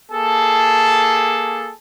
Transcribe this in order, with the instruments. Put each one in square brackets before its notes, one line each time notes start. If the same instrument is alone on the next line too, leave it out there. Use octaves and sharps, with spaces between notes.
[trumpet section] A#3 G#4 A4 A5